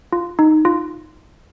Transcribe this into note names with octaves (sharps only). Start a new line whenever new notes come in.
F4
D#4
F4